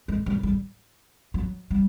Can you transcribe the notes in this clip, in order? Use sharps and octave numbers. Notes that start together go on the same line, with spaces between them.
G#3
G3
F#3
G3
F#3
G3